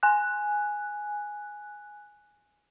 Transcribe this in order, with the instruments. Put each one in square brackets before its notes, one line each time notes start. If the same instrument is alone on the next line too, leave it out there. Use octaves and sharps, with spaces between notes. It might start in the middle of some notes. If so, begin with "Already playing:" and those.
[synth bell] G#5 F#6